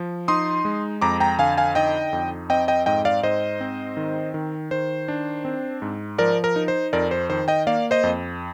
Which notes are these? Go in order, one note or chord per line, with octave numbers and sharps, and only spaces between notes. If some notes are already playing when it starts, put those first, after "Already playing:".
Already playing: F3
D#4 C6 D#6
G#3
F2 A#5 D6
G5 A#5
D3 F5 G#5
F5 G#5
D#4 D#5 G5
F2
C4 D#5 G5
D#5 G5
G#2 D#5 G5
D5 F5
G#2 C5 D#5
C4
D#3
D#3
D#3 C5
D4
C4
G#2
F3 A#4 D5
A#4
D#4
C5
F2 A#4 D5
C5
D#3 C5
D#5 G5
A#3 D5 F5
C5 D#5
F2